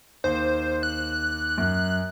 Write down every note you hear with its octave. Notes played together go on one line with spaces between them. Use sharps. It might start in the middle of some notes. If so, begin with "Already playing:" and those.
D#2 C5
F#6
F#2